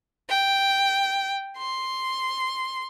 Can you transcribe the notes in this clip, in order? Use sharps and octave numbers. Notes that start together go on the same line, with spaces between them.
G5
C6